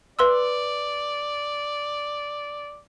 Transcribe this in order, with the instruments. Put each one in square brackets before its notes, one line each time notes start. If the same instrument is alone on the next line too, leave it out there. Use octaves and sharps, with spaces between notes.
[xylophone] B4 C6 E6 [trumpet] D5